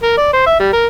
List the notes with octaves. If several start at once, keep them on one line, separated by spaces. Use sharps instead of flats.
A#4
D5
C5
E5
G3
A#4